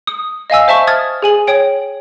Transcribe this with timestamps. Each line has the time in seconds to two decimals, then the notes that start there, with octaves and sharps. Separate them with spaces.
0.07 D#6
0.50 D#5 F5 G#5 E6
0.68 C5 E5 A5 C#6
0.87 D#6 F6 G#6 A6
1.22 G#4 G#5 F#7
1.47 C#5 G5 D7